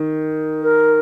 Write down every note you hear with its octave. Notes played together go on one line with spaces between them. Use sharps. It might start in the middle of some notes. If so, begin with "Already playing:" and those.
Already playing: D#3
A#4